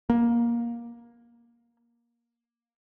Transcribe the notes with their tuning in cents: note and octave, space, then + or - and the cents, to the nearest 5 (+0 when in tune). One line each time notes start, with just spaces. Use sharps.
A#3 +15